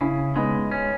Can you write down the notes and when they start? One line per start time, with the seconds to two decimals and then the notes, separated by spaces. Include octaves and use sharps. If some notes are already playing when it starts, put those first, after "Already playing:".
0.01 C#3 C#4 E4
0.36 G#3 B3 D#4
0.71 C#4